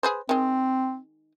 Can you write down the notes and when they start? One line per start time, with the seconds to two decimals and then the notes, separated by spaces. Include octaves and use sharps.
0.03 G#4 B4 C5
0.29 D#3 G#3 C4